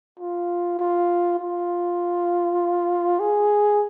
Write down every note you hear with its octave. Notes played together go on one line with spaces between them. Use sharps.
F4
F4
F4
G#4